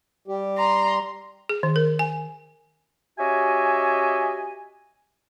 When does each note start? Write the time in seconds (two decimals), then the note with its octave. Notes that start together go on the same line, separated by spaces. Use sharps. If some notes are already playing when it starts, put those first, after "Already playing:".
0.28 G3 G4
0.58 A#5 C6
1.49 G#4
1.63 D#3
1.76 A#4
1.99 G#5
3.18 C#4 F#4 G4 D#5 E5 G#5